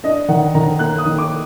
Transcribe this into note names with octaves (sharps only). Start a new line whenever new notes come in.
D4 D#5
D#3 F#5
D#3 A#5
A#3 F#6
D#6
D#3
D6